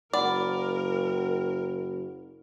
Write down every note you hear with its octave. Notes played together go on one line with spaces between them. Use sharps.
F#1 A#4 D5 F#5 B5